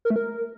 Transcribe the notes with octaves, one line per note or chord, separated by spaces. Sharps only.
A#4
A3
A#4